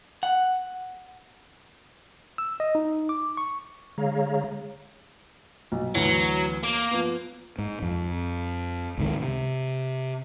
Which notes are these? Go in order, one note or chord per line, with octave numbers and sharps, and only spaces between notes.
F#5
E6
D#5
D#4
D6
C#6
D3 G#3 G#4 C#5 F5 A#5
B1
D2 E3 F#3
A#3
F3 B3
G#2
F2
C#2 G#2 D#3
C3